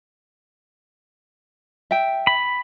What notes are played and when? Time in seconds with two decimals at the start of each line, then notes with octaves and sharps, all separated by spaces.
1.91 E5 G5
2.27 B5